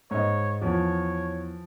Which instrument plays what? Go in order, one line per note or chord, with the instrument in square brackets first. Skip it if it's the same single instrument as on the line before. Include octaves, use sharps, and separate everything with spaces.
[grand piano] G#2 D#5 [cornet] C#5
[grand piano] E2 [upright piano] F3 [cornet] C#5